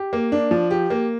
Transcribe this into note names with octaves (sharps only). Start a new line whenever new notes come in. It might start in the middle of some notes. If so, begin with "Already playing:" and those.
Already playing: G4
A#3
D4
F3
G4
A#3